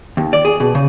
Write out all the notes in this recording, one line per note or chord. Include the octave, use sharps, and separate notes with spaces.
D#2
D5
G#4
B2
C#3